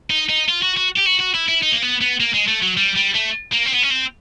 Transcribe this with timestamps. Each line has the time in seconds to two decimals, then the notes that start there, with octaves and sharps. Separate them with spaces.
0.10 D#4
0.30 D#4
0.49 F4
0.62 F#4
0.77 F#4
0.96 G4
1.05 F#4
1.19 F#4
1.34 E4
1.48 E4
1.63 D#4
1.72 A#3
1.82 B3
2.01 B3
2.20 A#3
2.34 G#3
2.48 A3
2.62 F#3
2.77 G3
2.96 G3
3.14 A3
3.53 A#3
3.66 C4
3.73 B3
3.83 C#4
3.91 C4